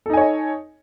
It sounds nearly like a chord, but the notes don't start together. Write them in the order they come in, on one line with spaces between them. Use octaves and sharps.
A4 D#4 G#5 C#5 D#5